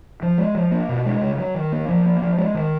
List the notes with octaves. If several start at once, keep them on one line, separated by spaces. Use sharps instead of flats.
F3
G#3
F3
A#3
B2
G#3
C#3
F#3
D#3
A#3
F3
A#3
F3
G#3
D#3